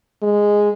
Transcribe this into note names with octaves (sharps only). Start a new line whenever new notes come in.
G#3